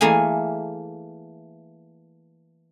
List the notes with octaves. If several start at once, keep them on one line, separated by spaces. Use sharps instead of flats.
E3 A3 A#3 G#4 G#5